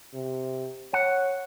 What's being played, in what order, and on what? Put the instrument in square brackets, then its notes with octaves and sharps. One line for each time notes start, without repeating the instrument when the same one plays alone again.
[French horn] C3
[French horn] C#5 [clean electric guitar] F#5